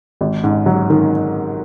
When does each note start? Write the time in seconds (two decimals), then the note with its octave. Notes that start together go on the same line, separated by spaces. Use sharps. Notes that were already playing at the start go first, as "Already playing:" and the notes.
0.21 G#1
0.44 G#2
0.66 F#3
0.90 D#3